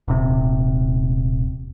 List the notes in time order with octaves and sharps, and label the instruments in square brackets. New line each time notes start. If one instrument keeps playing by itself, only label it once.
[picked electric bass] D#1 C3